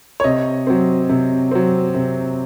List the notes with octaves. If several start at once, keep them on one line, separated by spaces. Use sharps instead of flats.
C#5
C3 D#5
F#3 C4
C3
F#3 C4
C3